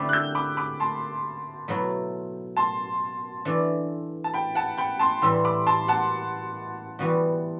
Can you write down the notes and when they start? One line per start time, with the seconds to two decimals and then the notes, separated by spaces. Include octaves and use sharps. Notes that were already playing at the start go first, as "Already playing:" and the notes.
Already playing: D3 A3 C4 E4 G4
0.09 F#6
0.13 E6 G6
0.35 B5 D6
0.57 B5 D6
0.80 A5 C6
1.68 B2 F#3 A3 E4
2.57 A5 C6
3.45 E3 A3 D4 A4
4.24 A5
4.34 G5 B5
4.55 F#5 A5
4.78 G5 B5
4.99 A5 C6
5.22 A2 E3 G3 C6 E6
5.45 B5 D6
5.67 A5 C6
5.88 F#5 A5
6.99 E3 G3 B3 F#4